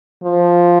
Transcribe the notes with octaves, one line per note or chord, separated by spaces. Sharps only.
F3